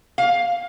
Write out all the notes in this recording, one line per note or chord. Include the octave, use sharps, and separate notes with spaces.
F5